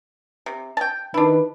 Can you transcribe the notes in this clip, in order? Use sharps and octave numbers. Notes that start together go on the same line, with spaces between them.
C3
G5 A5
D#3 D4 E4 B4